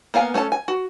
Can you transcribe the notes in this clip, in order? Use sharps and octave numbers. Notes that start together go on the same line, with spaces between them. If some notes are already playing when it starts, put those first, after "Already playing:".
A#3 B3 F5 G#5
A3 C#4 A4 A5
G#5
F#4